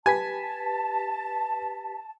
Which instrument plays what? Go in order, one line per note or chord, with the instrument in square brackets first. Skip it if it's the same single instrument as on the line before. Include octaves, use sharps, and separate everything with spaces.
[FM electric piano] G4 B4 B6 [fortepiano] G#5 [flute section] A5